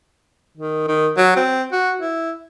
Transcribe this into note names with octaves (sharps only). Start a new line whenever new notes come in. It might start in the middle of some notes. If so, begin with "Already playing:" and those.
D#3
D#3
F#3
C4
F#4
E4